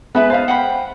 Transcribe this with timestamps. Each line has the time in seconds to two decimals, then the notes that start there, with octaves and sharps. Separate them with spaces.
0.15 G#3 B3 B4 E5 B5
0.30 D#4 C5 F5 A5
0.48 F#5 G5 B5